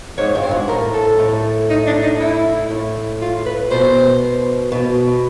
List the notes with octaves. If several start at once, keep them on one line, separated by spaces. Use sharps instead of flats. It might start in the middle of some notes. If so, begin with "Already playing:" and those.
G#2 C#5
G2
C5
G#2
A2 A#4
A4
A2
D#4
D4
D#4
E4
A2
F4
B4
B2 C5
B2